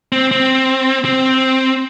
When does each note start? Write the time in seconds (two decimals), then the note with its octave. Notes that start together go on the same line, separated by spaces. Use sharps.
0.12 C4
0.31 C4
1.05 C4